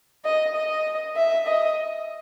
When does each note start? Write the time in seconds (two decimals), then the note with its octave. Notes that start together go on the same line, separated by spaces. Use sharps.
0.25 D#5
0.55 D#5
1.16 E5
1.47 D#5